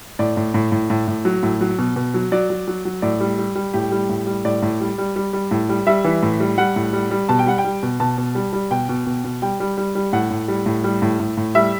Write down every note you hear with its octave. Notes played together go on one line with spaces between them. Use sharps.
A2 D5
A2
A2
A2
A2
A2
F#3
A2
F#3
B2
B2
F#3
F#3 D5
F#3
F#3
F#3
A2 D5
G3
G3
G3
A2 G4
G3
A2
G3
A2 D5
A2
G3
G3
G3
G3
A2
G3
G3 E5
E3
A2
G3
G3 F#5
A2
G3
G3
B2 A5
G5
G3 F#5
G5
G3
B2
B2 A5
B2
G3
G3
B2 G5
B2
B2
B2
G3 G5
G3
G3
G3
A2 F#5
A2
G3
A2
G3
A2
A2
A2
G3 E5